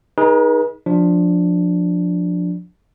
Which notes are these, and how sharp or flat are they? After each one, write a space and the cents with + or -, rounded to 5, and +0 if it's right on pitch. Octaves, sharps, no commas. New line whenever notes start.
D#4 +15 G#4 +0 B4 -45
F3 +20 D4 +0